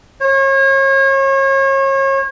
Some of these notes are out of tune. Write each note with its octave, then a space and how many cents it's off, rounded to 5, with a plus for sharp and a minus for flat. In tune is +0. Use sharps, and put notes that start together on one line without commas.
C#5 -35